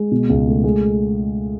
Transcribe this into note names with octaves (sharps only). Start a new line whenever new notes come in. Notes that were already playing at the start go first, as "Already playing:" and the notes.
Already playing: G#3
B2
C#2
A3
G#3